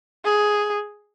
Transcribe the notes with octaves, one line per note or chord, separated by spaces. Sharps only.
G#4